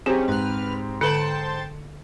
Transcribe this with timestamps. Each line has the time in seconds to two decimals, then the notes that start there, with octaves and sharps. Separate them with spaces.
0.06 F#3 C4 C#4 D#4 G4 G#4
0.28 G#2 B4 F6
1.01 D3 B4 C5 G5 A5 C#7 F#7